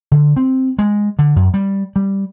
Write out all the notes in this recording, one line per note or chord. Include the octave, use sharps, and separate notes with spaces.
D3
C4
G#3
D3
F#2
G3
G3